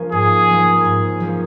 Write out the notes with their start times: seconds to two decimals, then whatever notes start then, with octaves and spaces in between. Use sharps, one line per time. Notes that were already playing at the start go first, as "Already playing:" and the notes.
Already playing: F3 A#3 C#4
0.12 G#2 G#4
0.49 F3 A#3 C#4
0.85 G#2
1.20 F3 A#3 C#4